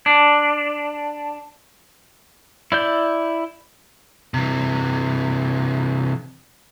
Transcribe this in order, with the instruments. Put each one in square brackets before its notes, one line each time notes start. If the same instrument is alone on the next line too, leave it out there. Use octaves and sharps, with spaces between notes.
[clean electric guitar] D4
[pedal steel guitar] E4 D5 G6
[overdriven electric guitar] C3 E3